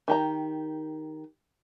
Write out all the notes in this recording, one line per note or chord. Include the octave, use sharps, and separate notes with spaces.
D#3 G4 A#5